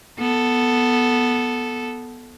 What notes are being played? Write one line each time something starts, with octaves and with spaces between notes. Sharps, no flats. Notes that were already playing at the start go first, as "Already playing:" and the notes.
B3 A4